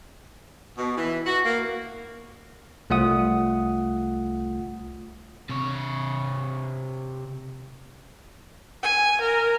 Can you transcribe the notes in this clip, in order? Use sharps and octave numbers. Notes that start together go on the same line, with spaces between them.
B2
E3
F#4
A#3
C2 A3 F4 F#5 D#6
C3 C#5
G#5
A#4